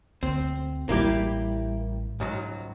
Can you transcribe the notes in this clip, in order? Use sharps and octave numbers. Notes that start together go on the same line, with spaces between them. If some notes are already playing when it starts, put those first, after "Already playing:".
D2 C4
A1 G3 A#3 E4 G4
C#2 G#2 F#3